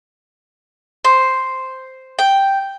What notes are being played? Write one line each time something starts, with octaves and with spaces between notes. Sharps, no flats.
C5
G5